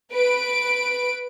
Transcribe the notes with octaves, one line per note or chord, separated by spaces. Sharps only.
B4 D7